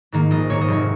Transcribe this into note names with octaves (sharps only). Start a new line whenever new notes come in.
G#2 D#3 A#3
A#1 D#5
G#2 D#3 A#3 C#5
D#5
F1 C#5